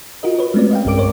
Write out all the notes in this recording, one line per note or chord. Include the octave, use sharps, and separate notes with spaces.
F4 F#4 A#4 D#5
B4 C#5
G#3 A3 C4 C#4 D5
D#5 F5 G5
B1 G2 G#3 A#4 D6 D7
A#4 C5 C#5